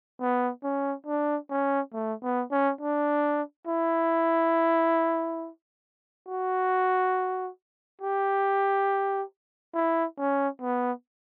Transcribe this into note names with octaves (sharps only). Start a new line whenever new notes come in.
B3
C#4
D4
C#4
A3
B3
C#4
D4
E4
F#4
G4
E4
C#4
B3